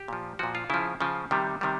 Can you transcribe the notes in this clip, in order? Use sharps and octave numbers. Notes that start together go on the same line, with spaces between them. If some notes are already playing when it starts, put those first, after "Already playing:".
Already playing: G4
A#2 F3
A#2 F3 F#4
F4
C#3 F3 E4
C#3 F3
C3 D#3 G3
C3 D#3 G3